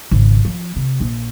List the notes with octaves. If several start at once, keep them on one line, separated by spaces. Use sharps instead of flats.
G#1 C#3
F3
C3
A#1